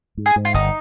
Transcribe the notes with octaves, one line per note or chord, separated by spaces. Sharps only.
G#2
G#4
G#2
F4
G1 D#4